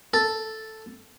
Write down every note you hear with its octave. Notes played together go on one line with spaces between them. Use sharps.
A4